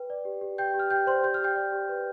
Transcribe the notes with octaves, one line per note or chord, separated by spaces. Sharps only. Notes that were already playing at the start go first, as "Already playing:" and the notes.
Already playing: B4 G5
D5
G4
G4
G4 G5 G6
G4
F6
G4 G5 G6
C5 D5 C6
G4 G6
F6
G4 G5 G6
D5
G4
B4